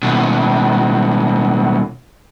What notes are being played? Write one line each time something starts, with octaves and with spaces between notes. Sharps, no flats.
D#2 B2